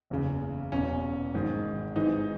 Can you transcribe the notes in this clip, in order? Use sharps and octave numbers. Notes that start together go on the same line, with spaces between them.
F#1 E2 C#3
E1 E2 B2 C#4
G#1 G#2 D#3
G#1 G#2 E3 D#4